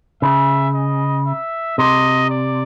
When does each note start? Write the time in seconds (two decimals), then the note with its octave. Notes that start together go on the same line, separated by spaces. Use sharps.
0.22 C#3 E5
0.74 D#5
1.27 E5
1.78 C3 D#5
2.30 D5